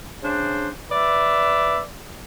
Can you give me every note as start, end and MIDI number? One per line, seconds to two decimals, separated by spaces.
0.23 0.68 49
0.23 0.68 62
0.23 0.68 72
0.90 1.79 71
0.90 1.79 74
0.90 1.79 76